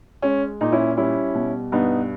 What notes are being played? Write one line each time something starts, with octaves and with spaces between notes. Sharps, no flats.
G#3 C#4
A#2 D#4
C#4 E4
G3 C#4 E4
B2
G2 B3 D#4